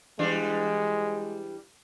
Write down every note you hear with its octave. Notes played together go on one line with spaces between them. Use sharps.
E3 G3 G#3 D4